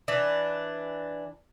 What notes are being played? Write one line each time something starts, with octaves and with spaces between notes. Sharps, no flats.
E3 D4